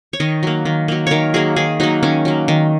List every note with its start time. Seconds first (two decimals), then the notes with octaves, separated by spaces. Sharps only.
0.13 C#5
0.20 D#3 D#5
0.43 F#3 A#3
0.65 D#3
0.88 F#3 A#3
1.07 D#3 A#4 C#5
1.34 F#3 A#3 G#4
1.56 D#3 G#4
1.80 F#3 A#3 D#4
2.03 D#3 C#4
2.25 F#3 A#3
2.48 D#3